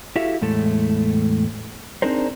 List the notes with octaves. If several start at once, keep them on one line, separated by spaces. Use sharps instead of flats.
E4 F#4 G4 A4 E5 F5
E2 A2 G#3 A3 A4
C4 D4 D#4 G#4 A#4 C5